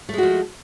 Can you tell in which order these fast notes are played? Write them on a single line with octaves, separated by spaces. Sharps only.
A3 G#3 F#4 F3